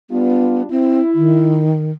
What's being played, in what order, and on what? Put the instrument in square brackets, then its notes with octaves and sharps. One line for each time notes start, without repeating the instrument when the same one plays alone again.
[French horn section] G3 D4 F4 [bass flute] B3
[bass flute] C4 [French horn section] E4
[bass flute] D#3